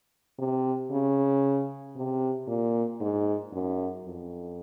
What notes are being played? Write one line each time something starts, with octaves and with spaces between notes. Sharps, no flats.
C3
C#3
C3
A#2
G#2
F#2
F2